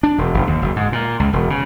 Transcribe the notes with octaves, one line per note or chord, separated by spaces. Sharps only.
D4
E1
E1
D#2
F#1
G#2
A#2
C#2
E1
C#3